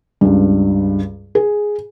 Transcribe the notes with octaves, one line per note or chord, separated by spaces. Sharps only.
C#2 G2
G#4